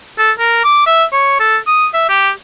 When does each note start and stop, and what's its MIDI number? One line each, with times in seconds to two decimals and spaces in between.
0.19 0.31 69
0.39 0.63 70
0.64 0.83 86
0.86 1.04 76
1.13 1.39 73
1.40 1.57 69
1.67 1.86 87
1.93 2.08 76
2.09 2.30 67